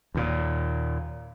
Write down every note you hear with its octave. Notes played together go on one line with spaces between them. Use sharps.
D#2 A#2